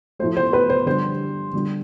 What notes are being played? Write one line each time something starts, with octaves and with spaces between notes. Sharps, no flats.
A2 F3 A3 C5
C5
B4
C5
D3 G3 C5
D3 G3